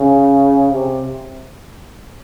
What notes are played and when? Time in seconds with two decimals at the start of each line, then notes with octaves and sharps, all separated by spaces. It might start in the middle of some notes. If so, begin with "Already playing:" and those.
Already playing: C#3
0.72 C3